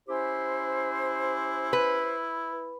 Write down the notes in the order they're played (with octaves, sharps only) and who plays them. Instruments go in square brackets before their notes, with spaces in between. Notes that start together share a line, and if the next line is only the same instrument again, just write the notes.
[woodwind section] C#4 G4 C5 [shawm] E4
[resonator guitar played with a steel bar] B4